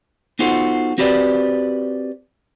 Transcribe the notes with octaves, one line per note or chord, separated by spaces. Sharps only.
B3 D#4 F4 F#4 A4 C5
C4 F#4 G4 B4 C5 D5